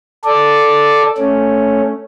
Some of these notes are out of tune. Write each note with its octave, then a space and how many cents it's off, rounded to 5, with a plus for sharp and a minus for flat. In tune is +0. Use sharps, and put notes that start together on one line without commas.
A4 +0 D5 +0
A3 +0 C#4 +0